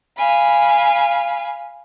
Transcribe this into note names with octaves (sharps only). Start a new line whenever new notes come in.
F5 G#5 B5